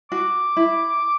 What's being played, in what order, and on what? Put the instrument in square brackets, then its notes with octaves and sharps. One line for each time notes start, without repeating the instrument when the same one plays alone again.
[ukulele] F#4 [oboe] D6
[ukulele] E4